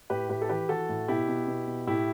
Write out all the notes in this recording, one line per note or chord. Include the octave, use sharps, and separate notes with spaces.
A2 G4 B4
A2 G4 B4
A4
E3 G4 B4
E3 F#4 A4
A2
B2 E4 G4
B2
B2
B2
A2 E4 G4